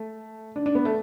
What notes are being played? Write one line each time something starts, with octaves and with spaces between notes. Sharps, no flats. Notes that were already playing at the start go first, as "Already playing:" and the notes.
Already playing: A3
D4
D4
B3
A3